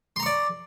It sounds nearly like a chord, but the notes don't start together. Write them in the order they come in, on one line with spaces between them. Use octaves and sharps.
C6 A#5 C#6 D5